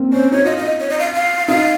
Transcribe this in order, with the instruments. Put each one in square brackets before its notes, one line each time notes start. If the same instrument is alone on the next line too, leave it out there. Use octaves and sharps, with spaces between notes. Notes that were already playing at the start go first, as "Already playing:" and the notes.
Already playing: [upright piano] A#3 C4
[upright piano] C#4 [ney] C5
[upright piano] D#4 [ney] C#5
[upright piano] F4 [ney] D#5
[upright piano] F4 [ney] D#5
[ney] C#5
D#5
F5
F5
[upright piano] D#4 [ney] F5